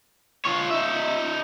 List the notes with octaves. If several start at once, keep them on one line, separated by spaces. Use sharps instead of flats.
F4 C#5
D#4 E5